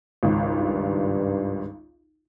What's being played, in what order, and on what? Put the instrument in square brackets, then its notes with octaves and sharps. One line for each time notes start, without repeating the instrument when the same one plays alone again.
[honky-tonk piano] G#1 C#2
[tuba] G2